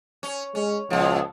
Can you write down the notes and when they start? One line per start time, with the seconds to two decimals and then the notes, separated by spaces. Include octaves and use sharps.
0.23 C#4
0.55 G#3 C#4
0.90 C#2 A#2 F3